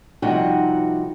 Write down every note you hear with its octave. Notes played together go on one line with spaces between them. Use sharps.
C3 F3 G3 D#4 F#4 F#5